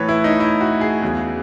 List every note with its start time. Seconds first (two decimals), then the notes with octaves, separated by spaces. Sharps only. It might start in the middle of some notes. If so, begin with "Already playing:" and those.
Already playing: A2 E3 B4 C#5
0.09 E4
0.24 D#4
0.40 E4
0.61 F#4
0.81 G#4
1.02 E2 C#3 F#3